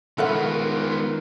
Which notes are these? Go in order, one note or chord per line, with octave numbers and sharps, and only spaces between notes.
D#3 G#3 B3 F4 A4 B4 F5 F#5